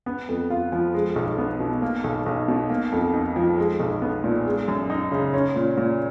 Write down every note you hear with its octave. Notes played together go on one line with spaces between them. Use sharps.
B3
F2
F4
F3
G#3
B1
B3
B2
A#3
B1
B1
B2
A#3
F2
D#4
F3
G#3
B1
B3
A#2
G#3
F#2
D#4
C#3
C#4
A#2
A#2